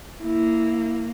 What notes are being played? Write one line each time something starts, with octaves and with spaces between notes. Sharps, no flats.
A#3 E4